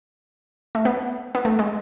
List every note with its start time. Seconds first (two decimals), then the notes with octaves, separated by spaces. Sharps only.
0.75 A3
0.85 B3
1.35 B3
1.45 A3
1.59 G#3